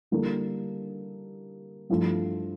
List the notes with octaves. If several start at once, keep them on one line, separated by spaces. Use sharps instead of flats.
D3 G3 A#3 E4 A4
G2 F3 A3 E4